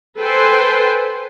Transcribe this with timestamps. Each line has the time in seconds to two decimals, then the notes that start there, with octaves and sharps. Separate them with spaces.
0.20 A4 B4 C5 G5 G#5 C6